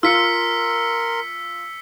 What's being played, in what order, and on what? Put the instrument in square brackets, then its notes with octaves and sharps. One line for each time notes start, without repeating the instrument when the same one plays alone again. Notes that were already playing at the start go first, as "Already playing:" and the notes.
[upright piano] F4 [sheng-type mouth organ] A#4 C6 [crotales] E6 B6 C#7